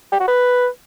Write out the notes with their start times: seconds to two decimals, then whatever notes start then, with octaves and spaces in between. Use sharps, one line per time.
0.12 G4
0.20 F#4
0.28 B4